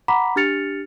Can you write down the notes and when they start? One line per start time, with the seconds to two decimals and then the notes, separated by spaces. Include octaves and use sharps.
0.08 F#5 A#5 B5 D6 B6
0.36 D4 G4 F6 A6 C#7 F7